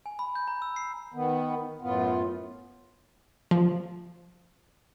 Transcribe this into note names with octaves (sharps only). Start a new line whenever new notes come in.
G#5
B5
G6
A#5
E6
C7
D#3 B3
F#2 A2 B3 F4
F3